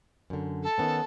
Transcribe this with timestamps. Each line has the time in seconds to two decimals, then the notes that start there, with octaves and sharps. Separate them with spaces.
0.30 F#2 D3
0.63 A4
0.78 D#3 B3 C#4